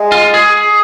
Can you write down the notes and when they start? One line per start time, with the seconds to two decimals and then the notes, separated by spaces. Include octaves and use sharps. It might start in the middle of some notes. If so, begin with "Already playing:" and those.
Already playing: G#3
0.12 F4
0.34 G#4